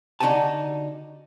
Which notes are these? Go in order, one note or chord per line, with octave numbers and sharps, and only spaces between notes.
D3 D#4 F#4 G4 G#5 A5